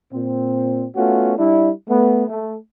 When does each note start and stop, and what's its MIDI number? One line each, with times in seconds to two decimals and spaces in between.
0.12 0.85 46
0.12 0.85 60
0.95 1.32 57
0.95 1.32 59
0.95 1.32 61
0.95 1.32 65
0.95 1.32 66
1.37 1.70 55
1.37 1.70 62
1.37 1.70 64
1.88 2.26 57
1.88 2.26 59
2.27 2.55 57